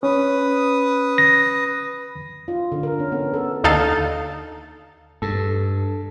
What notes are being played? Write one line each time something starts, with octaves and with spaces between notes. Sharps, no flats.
C#4 B4 D#6
A#6
F4
D3
A#4
C#4
B3
A4
D#2 D3 D#4 A4 F5 A6
G2 A4